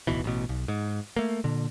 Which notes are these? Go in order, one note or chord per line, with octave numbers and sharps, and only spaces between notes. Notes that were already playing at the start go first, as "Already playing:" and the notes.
D1 B1 B2 E3
A1 B2
B1
G#2
A3 A#3
A#2 D3